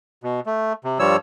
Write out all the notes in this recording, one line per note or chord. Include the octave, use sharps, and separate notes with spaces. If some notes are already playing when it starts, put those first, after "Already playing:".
B2
A3
C3
G2 F3 G3 C#5 E6